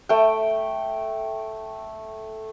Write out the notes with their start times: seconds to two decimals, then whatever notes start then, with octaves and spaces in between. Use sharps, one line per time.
0.09 A3 G5